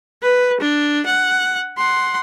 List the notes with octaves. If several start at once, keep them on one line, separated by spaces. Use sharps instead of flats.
B4
D4
F#5
F#5 C6